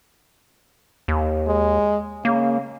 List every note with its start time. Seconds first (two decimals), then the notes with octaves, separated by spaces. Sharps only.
1.08 D#2
1.48 G#3
2.25 C#3 A#3